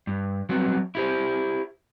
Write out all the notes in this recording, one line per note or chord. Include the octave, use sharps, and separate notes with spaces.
G2
F#3 G3 B3 C4 F#4
E4 G4 C5